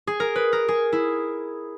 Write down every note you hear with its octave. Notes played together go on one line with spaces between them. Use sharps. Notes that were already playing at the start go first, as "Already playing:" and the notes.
G#4
A#4
B4
A#4
G#4
E4